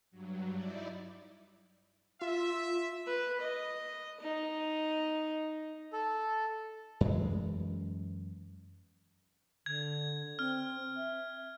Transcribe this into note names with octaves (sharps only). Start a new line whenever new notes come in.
G2 F#3
D#4 E4 D5
F4 E5
B4
D#5
D#4
A4
F#2 E3 G#3
D3 G#6
C4 F6
E5